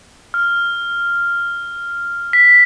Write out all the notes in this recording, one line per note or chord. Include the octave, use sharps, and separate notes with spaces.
F6
B6